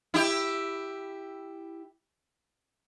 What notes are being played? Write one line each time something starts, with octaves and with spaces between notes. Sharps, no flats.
E4 G4